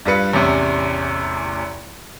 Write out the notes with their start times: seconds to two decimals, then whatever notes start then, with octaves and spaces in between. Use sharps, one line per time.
0.05 G2 G3 F4 B4 C#7
0.33 A1 E2 C3 C#4